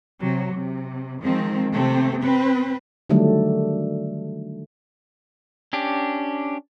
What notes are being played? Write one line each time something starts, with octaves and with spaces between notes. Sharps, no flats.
C3 F#3
C3
D#3 F3 G#3 C4
C3 A3 C4
C4 B4
D3 D#3 F#3 G3 A3 D4
C#4 D4 G4